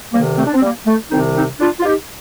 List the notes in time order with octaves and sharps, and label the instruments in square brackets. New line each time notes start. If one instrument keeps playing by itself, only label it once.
[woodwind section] D2 C3 D#3 G3 A#3
A3 C4
D4
C4
G3 A#3
A3
C2 C3 D#3 C4 D#4
C4 D#4
D4 F4
F4
D#4 G4